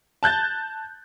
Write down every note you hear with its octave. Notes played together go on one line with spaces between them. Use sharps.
A5 F#6 G6 A6